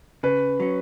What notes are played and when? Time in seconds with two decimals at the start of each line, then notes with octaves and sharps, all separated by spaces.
0.23 C#3 B4
0.60 F#3 C#4